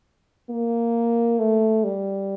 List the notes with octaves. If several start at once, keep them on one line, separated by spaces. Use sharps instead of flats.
A#3
A3
G3